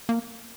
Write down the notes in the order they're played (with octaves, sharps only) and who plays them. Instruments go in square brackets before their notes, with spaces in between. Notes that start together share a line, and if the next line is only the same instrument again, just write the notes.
[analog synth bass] A#3